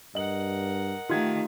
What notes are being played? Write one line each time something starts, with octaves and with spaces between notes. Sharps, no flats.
G2 A#4 D#5 F#5 F#7
D#3 A3 F4 G4 G#6